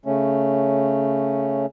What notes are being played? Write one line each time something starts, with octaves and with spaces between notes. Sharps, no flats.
C#3 A3 C#4